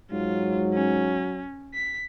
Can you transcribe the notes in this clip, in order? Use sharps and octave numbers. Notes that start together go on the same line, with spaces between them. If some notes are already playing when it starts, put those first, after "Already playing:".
G#2 F#3 F4
C#4
B6